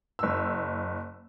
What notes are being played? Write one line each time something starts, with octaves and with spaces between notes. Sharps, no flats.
F#1 E6